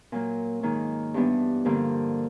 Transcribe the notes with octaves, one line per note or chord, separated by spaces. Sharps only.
A#2 F#3 A#3
G#2 D#3 F#3 A#3
G2 E3 G3 B3 D4
G2 D3 F3 A#3